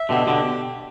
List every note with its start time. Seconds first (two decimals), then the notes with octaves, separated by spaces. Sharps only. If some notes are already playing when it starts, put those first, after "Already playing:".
Already playing: E5
0.09 B2 D3 G4
0.27 B2 D3